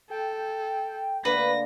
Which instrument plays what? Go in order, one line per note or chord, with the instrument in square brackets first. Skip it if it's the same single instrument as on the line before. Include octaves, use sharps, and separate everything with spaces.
[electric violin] A4 [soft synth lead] G5
[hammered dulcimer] D3 A#3 [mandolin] B4 [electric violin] A#6